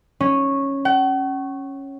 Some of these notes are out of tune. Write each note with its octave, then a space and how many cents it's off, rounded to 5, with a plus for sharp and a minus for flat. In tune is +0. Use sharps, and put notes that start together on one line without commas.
C#4 -10
F#5 +45